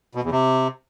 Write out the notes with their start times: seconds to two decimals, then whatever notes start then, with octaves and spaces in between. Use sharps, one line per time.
0.15 B2
0.23 E2
0.32 C3